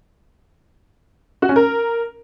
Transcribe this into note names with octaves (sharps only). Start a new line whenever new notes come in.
F#4
C#4
A#4